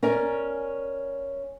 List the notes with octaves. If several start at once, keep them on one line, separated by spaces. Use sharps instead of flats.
C#4 A#4 D5